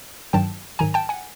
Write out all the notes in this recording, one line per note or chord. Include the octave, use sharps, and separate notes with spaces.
G2 D#3 F#3 G5 A5
G#2 D#3 F#3 G#5 A#5
G5 A5
F#5 G#5